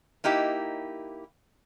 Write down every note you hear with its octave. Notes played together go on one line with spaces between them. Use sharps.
A#3 D#4 E4 G4